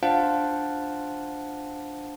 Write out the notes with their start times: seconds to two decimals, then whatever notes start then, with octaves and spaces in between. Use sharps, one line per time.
0.03 D4 F4 C5 F5 F#5 A5